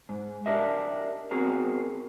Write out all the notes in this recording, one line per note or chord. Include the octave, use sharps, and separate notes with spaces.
G#2
D4 G4 A#4 D#5 E5
B3 C4 F#4 G#4 A#4